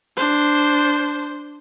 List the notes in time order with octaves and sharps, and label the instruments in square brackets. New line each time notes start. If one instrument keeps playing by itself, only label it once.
[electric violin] D4 C5